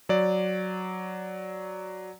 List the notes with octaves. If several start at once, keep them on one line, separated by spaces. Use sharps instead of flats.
F#3 D5